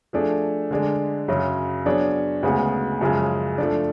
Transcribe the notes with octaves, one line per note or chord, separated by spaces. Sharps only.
F3 A3 D4 G#4
D3 G#3 D4
F#2 C#3 F#3
F#3 B3 D4 G#4 C#5
D2 C#3 G#3 B3 F#4
F#2 C#3 F3 G#3
F3 A3 D4